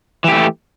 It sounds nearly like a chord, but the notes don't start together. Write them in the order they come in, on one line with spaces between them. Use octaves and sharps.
E3 G4 A3